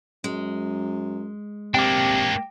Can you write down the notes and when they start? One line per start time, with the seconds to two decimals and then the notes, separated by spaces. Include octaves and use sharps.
0.24 F#2 G#3
1.75 C3 A#3 D4 G5 D6